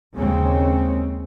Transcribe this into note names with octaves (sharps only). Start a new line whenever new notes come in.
D#2 C#3 G#3 C4 C#4